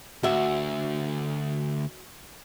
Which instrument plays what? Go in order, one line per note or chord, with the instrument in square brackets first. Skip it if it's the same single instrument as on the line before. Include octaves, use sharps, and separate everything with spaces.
[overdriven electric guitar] D2 [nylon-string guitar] F#4 E5